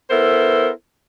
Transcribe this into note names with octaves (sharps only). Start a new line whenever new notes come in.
B3 E4 A4 A#4 C5